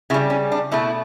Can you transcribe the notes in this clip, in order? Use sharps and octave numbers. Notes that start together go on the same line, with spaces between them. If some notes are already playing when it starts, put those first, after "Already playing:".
C#3 G3 E4
C#4
D4
B2 A3 E4